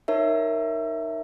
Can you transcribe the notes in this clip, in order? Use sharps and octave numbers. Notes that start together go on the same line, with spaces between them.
D#4 A#4 C#5 E5